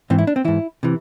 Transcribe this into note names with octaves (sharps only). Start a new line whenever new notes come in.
G#2 E3 C4
E4
D4
C4
G#2 E3 E4
C3 E3